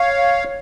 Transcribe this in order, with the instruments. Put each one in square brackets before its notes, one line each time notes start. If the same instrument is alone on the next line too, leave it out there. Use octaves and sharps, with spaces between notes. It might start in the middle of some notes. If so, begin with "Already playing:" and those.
Already playing: [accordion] C#5 F5